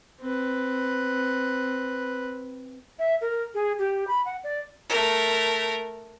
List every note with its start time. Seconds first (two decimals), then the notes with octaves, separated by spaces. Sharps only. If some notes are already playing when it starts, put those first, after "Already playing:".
0.20 C4 B4
2.99 E5
3.21 A#4
3.54 G#4
3.79 G4
4.08 B5
4.25 F#5
4.44 D5
4.89 A3 A#4